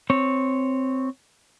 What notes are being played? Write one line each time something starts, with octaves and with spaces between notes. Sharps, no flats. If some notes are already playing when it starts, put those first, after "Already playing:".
C4 C#5